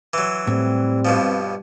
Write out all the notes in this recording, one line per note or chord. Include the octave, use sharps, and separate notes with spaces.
E3 F#3
A2 G3 C4
G2 B2 F3